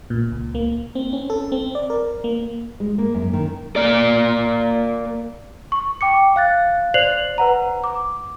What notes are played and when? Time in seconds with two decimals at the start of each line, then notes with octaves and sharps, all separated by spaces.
0.10 A#2
0.32 C#2
0.55 A#3
0.95 C4
1.13 C#4
1.30 A4
1.52 C4
1.75 D5
1.90 A#4
2.24 A#3
2.80 G#3
2.98 A#3
3.15 F#2
3.33 D#3
3.76 A#3 D5
5.72 C#6
6.01 G5 D6 C#7
6.36 F5 F#6 A6
6.94 C5 D5 F#6 C7 F7 F#7
7.38 B4 F#5 A#5
7.84 D6